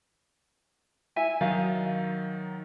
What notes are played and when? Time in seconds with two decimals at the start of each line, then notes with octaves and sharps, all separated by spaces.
1.16 E4 E5 G#5
1.41 D#3 F#3 D#4 D#5 F5